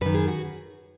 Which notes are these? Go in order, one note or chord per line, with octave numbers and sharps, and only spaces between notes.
F#2 D#3 B4
G#4
F#4